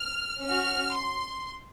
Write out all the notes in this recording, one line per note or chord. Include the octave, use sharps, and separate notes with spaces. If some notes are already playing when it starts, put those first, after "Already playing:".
Already playing: F6
C#4 F#4 F6
C6